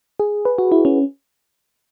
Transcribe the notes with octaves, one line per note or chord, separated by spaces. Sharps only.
G#4
B4
F#4
E4
C#4